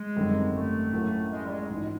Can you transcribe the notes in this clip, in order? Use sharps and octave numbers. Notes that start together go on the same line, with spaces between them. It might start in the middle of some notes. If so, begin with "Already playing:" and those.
Already playing: G#3
G#1 F#2 D3 G3 C4
A3
A2 F#3 A#3 C#4
G#3
G3
G#3
A#1 G#2 E3